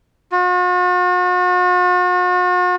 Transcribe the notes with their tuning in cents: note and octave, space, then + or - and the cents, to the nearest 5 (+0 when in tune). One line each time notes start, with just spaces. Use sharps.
F#4 -45